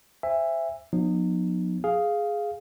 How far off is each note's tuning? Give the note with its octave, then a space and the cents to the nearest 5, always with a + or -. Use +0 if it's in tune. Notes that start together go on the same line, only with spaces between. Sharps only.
C5 +0 E5 +10 G#5 -30
F3 +40 B3 -15 D#4 -35
G#4 +5 F5 +0